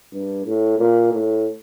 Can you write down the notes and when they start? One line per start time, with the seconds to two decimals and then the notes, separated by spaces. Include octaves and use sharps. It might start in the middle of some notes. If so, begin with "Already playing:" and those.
0.13 G2
0.45 A2
0.78 A#2
1.13 A2